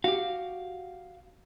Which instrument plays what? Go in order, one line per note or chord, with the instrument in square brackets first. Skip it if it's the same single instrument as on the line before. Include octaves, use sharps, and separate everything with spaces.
[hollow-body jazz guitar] F#4 G4 [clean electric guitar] F5